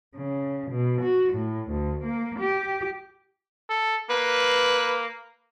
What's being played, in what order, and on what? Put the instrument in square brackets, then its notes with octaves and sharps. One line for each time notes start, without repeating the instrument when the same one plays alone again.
[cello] C#3
B2
F#4
A2
D2
A#3
G4
[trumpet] A4
[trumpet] A#3 [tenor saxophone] B4